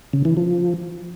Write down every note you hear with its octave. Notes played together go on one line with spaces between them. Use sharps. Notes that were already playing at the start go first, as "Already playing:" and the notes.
C#3
E3
F3